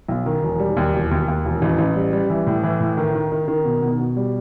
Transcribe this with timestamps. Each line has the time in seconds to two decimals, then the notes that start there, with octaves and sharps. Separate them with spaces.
0.09 B1
0.26 D#3
0.44 E1
0.60 G3
0.77 D#2
0.93 E1
1.11 D#2
1.28 D#2
1.45 E1
1.62 A1
1.78 A1
1.96 G3
2.13 G3
2.30 E3
2.47 A2
2.63 E3
2.80 A2
2.97 D#3
3.14 D#3
3.32 D#3
3.48 D#3
3.65 B2
3.82 B2
4.00 B2
4.17 G3